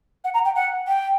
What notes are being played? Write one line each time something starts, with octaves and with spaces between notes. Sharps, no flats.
F#5
A#5
G5
F#5
G5